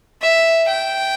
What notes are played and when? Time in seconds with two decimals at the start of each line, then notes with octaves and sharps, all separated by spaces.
0.22 E5
0.68 G5